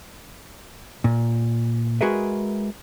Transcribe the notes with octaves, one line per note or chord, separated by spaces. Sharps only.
A#2
G#3 F#4 G#4 A#4 B4 E5